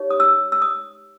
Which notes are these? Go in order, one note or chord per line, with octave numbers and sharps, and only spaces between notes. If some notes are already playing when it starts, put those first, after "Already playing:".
Already playing: D#4 G4 C#5
D#6
E6
E6
D#6